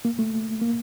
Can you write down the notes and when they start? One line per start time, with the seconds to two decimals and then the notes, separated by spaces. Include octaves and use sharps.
0.05 A#3
0.19 A3
0.62 A#3